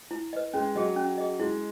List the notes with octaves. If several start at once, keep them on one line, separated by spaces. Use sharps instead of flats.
E4
B4 D#5
G#3 C#4
F#3 G#4 D#5
C#4
G#4 D#5
G#3 E4